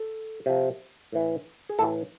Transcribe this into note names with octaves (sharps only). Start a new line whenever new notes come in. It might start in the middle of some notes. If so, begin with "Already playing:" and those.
Already playing: A4
C3 F3
A2 E3
G#4
A2 E3 A4